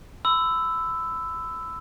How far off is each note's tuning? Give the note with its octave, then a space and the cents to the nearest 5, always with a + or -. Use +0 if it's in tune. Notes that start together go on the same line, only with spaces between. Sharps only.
B5 +35 E6 +0